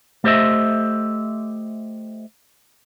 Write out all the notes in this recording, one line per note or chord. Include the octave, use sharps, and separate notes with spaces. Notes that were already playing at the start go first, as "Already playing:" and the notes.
A3 G4 C5 D#5 E5